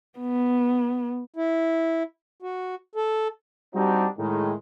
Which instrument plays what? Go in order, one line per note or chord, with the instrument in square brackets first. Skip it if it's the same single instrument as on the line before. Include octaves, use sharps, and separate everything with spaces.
[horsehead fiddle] B3
[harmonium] E4
F#4
A4
[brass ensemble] G3 C4 D4 D#4 F#4 G4
A2 D#3 G#3